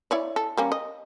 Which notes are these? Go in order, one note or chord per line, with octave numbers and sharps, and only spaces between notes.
E4 C#5 D5
A4
G3 A#3 C#4
D#5